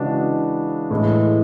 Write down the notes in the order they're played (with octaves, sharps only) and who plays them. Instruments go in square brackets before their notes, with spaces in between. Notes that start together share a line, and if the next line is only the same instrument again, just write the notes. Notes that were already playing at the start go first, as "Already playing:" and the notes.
Already playing: [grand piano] C#3 E3 G#3 D4 F#4
A2 E3 G#3